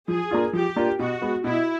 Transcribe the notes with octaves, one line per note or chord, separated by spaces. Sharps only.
F3 G#4
A#3 D4 F4
F3 G4
A#3 D4 F4
B2 F#4
G#3 B3
B2 E4